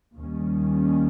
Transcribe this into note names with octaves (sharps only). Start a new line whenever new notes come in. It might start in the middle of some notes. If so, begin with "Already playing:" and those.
D#2 D#3 G3 C#4